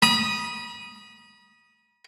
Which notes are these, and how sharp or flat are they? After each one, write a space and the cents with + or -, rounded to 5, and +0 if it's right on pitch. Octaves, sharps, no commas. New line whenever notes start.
B5 -40 D#6 +0